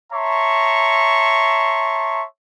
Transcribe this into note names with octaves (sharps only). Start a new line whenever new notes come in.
C#5 E5 A5 A#5 C6 C#6